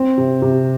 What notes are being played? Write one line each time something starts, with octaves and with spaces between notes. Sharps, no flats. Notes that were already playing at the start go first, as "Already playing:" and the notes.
Already playing: C4
C3
C3